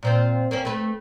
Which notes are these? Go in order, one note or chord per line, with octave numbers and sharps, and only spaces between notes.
A#2 C4 F4
A#3 C4 C#4
A3 B4